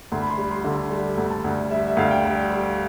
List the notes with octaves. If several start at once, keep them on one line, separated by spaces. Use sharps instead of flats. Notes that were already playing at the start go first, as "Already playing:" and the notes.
D2 C6
B5
C6
G3
C6
D3
G3
D2
A5
D2
G3 E5
E5
D2 F5
G5
G3
G3